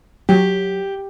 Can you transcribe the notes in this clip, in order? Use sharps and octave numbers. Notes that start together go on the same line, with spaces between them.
F#3 G4